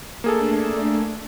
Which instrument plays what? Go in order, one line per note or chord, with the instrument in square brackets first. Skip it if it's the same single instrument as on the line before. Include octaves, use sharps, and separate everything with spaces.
[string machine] A3 D4 [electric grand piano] A#3 G#4 A4